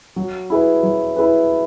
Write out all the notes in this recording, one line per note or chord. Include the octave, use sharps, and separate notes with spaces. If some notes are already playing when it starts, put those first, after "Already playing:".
F#3
E4 G#4 B4
F#3
E4 G#4 B4